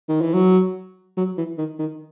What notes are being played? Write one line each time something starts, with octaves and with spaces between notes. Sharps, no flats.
D#3
E3
F#3
F#3
E3
D#3
D#3